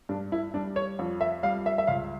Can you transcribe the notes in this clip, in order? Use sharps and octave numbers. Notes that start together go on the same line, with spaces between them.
G2 D4
E4
G3 D4
C#5
F2
E5
G3 F5
E5
E5
C#2 F5